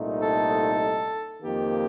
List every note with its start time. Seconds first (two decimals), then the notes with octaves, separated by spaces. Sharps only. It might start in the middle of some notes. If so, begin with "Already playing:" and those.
Already playing: C2 A#2 A3 D#4
0.22 A4
1.41 F2 D#3 A#3 G4